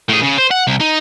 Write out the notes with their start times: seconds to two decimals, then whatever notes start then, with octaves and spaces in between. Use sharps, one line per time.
0.10 A2 G#4
0.23 C#3
0.38 C5
0.51 F#5
0.67 C2
0.80 D#4